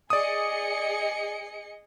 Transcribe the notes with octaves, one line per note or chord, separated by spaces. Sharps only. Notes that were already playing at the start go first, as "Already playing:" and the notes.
G#4 D5 D#5 D#6 C#7